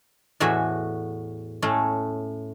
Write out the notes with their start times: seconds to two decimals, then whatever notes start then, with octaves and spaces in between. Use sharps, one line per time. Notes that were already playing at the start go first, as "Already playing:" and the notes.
0.40 E2 A2 F#4 E5 G#5
1.62 A2 A3 C#4